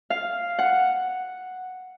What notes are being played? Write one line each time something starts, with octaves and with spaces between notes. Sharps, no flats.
F5
F#5